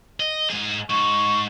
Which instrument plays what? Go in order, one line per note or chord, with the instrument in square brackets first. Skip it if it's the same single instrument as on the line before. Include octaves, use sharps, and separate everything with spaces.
[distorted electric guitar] D#5
G#2 G#4
[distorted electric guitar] G#2 [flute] C#6